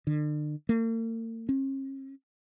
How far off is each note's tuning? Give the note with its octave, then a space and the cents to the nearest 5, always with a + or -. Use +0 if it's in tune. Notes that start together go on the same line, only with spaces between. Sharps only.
D3 +40
A#3 -45
C#4 -45